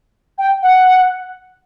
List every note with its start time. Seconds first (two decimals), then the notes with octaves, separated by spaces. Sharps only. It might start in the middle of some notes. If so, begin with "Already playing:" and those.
0.38 G5
0.63 F#5